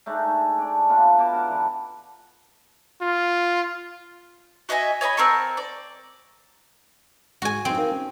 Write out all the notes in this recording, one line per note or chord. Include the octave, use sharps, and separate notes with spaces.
A3 D4 D#4 G#4
D4 D5
A#3 B3 D4 F4
B2 A5 D6
A#4 F#5 A5
D3 E3
F4
F#4 D#5 E5 G#5
C#5 D#5 G#5 B5
C4 A#4 A5 C#6
D5
G#2 F#4 G#4 G#5
F2 B3 C4 D#4
D#4 A#4 F5
C#4